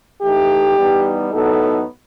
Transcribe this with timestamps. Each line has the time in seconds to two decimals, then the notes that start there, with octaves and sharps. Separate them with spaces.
0.21 E3 A3 D#4 G4
0.76 E3 G3 B3 D#4
1.30 A2 F#3 B3 D#4 A4